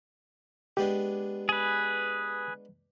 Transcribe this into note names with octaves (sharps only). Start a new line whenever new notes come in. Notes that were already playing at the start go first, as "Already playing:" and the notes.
G#3 B3 D4 G4
G#4 B4